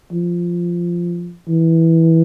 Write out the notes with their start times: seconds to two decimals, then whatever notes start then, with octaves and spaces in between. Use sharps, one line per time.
0.12 F3
1.48 E3